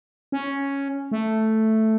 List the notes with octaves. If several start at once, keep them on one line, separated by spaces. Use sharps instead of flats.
C#4
A3